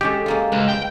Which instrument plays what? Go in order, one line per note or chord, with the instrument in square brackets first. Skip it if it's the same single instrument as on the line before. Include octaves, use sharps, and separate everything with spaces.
[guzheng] G#3 C#4 A4 [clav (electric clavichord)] G4
[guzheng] G#3 A#3 F4
[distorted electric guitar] C#2 [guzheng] B4
[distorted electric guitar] G5